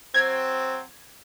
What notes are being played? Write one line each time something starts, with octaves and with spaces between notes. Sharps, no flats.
F#3 C4 G#6